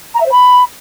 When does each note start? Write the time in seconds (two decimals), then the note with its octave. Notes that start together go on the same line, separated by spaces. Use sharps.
0.14 A#5
0.20 E5
0.25 C5
0.31 B5